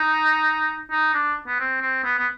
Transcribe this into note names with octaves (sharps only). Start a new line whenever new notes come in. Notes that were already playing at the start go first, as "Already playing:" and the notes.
Already playing: D#4
D#4
D4
B3
C4
C4
B3
B3